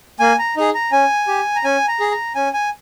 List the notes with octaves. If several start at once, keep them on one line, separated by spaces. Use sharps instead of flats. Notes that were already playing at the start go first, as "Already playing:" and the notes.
A#3 G#5
A#5
D#4 G#4
A#5
C#4 G#5
G4
A#5
C#4 G#5
A#5
G#4
A#5
C#4 G#5
G#5